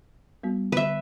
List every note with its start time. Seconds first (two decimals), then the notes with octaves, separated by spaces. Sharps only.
0.43 G3 B3 F#4
0.72 D3 B4 E5